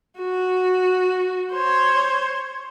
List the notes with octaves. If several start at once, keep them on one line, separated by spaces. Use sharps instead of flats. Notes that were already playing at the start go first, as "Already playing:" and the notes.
F#4
C5 C#5